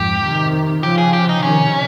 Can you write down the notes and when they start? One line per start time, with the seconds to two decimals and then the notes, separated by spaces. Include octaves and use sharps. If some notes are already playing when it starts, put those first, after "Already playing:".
Already playing: F2 G#2 G4
0.23 C3 D#3
0.83 C#3 F3 G4
0.98 G#4
1.13 G4
1.29 D#4
1.43 C3 D#3 C#4